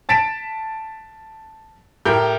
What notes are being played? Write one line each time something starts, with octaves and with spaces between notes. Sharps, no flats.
A5 A6 B6 D7 E7
A2 G4 A#4 G6